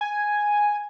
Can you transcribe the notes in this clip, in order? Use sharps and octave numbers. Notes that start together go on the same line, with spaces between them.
G#5